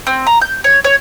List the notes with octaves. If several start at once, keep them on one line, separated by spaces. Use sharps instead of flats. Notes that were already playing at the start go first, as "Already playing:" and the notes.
C4
A#5
G6
C#5
C#5